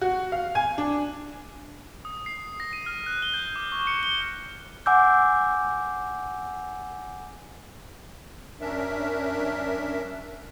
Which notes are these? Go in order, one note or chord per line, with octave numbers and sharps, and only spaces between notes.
F#4
F5
G#5
D4
D#6
C7
A#6
D#7
F6
F#6
G7
G6
D6
C#6
C#7
G7
F#5 G#5 D6 E6 G6
F#2 C#4 D4 A#4 E5